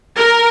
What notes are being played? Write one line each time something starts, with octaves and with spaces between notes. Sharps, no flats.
A#4